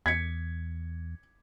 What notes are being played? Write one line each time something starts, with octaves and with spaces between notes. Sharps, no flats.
E2 G#6 B6 C#7